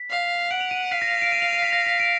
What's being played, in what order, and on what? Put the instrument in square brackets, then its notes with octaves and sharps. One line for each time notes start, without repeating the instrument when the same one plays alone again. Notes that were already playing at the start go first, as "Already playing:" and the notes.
Already playing: [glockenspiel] B6
[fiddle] F5
[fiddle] F#5 [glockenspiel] D7
[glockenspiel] F7
D#7
[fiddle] F5 [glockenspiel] B6
[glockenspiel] A#6
B6
D7
D#7
F7
D#7
B6
A#6
B6
D7